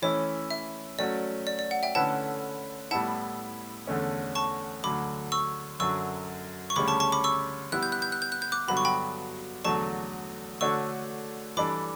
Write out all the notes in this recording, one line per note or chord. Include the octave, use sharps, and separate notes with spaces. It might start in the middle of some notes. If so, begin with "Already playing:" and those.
E3 A3 C#4 E4 C#5
E5
F#3 A3 C#4 F#4 D5
D5
D5
F#5
E5 G5
D3 A3 C#4 E4 B4 F#5 A5
A2 G3 B3 E4 F#5 A5
E2 D3 A3 C#4
A5 C#6
D2 D3 F#3 B5 D6
C#6 E6
F#2 D3 F#3 C#6 E6
C#6
D2 C#3 G3 C#4 B5 D6
A5 C#6
A5 C#6
B5 D6
C#6 E6
G3 B3 E4 G4 F#6
G6
F#6
G6
F#6
G6
F#6
G6
D6 F#6
G2 D3 F#3 B3 F#4 B5
C#6
G5 B5
E2 D3 F#3 A3 D4 A5 C#6
D3 A3 D4 F#4 C#5 C#6 E6
E3 G3 D4 A4 D5 B5 D6